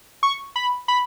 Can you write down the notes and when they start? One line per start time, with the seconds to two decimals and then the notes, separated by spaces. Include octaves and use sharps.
0.23 C#6
0.56 B5
0.88 B5